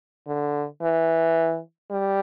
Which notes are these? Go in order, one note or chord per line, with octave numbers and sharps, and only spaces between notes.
D3
E3
G3